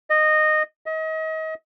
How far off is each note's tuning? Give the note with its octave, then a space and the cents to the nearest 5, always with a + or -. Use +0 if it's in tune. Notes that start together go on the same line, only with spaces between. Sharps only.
D#5 -15
D#5 +35